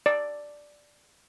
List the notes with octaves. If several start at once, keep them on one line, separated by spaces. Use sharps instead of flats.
D5